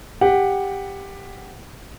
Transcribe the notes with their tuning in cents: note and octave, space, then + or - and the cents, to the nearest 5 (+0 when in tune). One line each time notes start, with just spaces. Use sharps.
G4 +10 F#5 +0